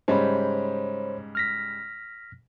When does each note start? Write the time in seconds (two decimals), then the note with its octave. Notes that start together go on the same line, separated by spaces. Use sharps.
0.08 G#2 C#3 G3 C5 C#5 B5
1.35 F6 A#6 B6